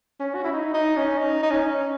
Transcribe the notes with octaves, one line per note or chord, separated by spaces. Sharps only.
C#4
F#4
E4
D#4
D#4
C#4
D#4
D#4
C#4